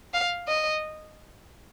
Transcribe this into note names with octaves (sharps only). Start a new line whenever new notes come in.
F5
D#5